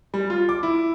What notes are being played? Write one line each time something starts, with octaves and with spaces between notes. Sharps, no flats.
G3
F4
D6
E4